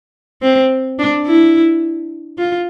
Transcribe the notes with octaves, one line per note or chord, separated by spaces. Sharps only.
C4
D4
E4
F4